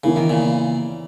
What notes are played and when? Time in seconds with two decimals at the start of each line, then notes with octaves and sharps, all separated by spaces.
0.04 C#3 E3 B3 E4 A#4
0.16 D#3
0.29 A#2 C#3